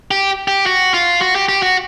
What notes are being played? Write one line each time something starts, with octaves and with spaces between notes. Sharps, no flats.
G4
G4
F#4
F4
F#4
G4
G4
F#4